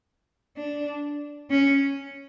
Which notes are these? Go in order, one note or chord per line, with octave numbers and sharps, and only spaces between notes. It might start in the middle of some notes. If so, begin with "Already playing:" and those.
D4
C#4